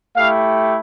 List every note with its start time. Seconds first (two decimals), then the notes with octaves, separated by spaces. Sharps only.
0.16 A3 E4 G4 F5